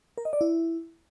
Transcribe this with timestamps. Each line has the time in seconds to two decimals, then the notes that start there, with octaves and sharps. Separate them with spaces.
0.18 A#4
0.25 D#5
0.33 D5
0.41 E4